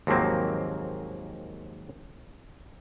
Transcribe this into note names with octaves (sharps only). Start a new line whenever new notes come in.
D#2 G#2 F3 F#3 A#3 C4